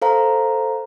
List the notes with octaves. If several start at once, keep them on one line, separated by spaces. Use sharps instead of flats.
A4 C5 F5 A#5